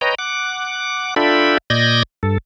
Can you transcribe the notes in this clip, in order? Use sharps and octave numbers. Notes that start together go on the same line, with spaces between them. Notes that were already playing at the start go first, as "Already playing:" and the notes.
B4 C#5 D#5 G5 A#5
F#5 D6
D4 F4 A4 E5 G5 B5
A#2 D5 D#5 G6 G#6 A#6
G2 A4